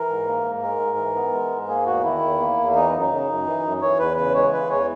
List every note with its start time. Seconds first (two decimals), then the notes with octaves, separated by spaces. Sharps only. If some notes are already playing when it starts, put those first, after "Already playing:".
Already playing: E3 A#4
0.09 G#2
0.27 A#3
0.44 G#2
0.62 G#3 A#4
0.79 G#2
0.98 E3
1.15 B3
1.33 G#3
1.51 G#2
1.68 A#3 G#4
1.86 E2 F#4
2.04 D#3 E4
2.22 E2
2.39 A#3
2.57 E2
2.75 E3 D#4
2.93 F#2
3.02 D#4
3.11 C#3
3.28 F#2
3.46 E3
3.63 F#2
3.82 E3 C#5
3.99 E2 B4
4.17 C#3 B4
4.34 G#3 C#5
4.53 E3 B4
4.70 E2 C#5